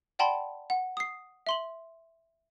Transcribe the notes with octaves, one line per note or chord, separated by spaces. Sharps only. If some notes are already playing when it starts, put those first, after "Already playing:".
D5 F#5 G5 A5 B5 C6
F#5
D#6 C7
E5 C6 F#7